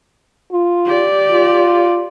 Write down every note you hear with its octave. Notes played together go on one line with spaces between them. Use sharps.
F4
G4 D5
F4